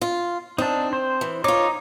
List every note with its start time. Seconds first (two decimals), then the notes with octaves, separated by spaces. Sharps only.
0.02 F4
0.58 C4 D4 D#4
0.93 C5
1.21 E3
1.44 D#4 F4 C#5 D6